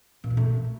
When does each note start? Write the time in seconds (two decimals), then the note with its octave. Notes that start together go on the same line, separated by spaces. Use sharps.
0.24 A#2
0.30 G2
0.37 A3